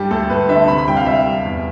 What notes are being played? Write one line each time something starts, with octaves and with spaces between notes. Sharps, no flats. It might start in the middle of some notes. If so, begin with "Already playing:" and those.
Already playing: G2 G3 G4
D2 A4
D2 B4
D3 E5
C3 B5
B5
C2 G5
F5
C2 E5
G3
E2